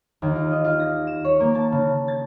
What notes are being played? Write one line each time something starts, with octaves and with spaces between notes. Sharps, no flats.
D#2
F4
D#5
F4
A#6
E7
C#5
A#3
A5
C#3
A6